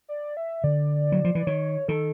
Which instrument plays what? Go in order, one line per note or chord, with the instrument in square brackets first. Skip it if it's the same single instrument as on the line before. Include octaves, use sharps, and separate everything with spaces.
[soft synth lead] D5
E5
[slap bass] D3 [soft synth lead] D5
[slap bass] F#3
F3
[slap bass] E3 [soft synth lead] D5
[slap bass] D#3 [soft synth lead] C#5
[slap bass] D#3 [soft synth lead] A4